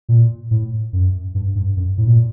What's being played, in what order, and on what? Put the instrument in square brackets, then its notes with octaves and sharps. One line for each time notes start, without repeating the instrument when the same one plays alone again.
[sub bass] A#2
A2
F#2
G2
G2
F#2
A2
A#2